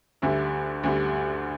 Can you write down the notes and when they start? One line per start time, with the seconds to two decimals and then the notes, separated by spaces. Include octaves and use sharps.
0.22 D2 D3 G3 E5
0.83 D2 D3 G3